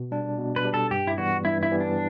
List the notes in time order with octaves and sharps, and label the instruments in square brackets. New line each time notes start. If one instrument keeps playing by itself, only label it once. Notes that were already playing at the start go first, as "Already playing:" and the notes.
Already playing: [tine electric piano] B2
G3 D4
B2
[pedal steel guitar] B4
[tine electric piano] G3 D4
[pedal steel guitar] A4
[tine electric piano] G2 [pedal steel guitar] G4
[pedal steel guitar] E4
[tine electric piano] E3 G3 B3 [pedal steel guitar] F#4
[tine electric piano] G2 [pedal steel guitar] E4
[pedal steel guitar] E4
[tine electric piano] E3 G3 B3
[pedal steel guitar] D4